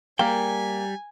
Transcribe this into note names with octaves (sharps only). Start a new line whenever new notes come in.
G3 A#3 G#4 G5 G#5 A#5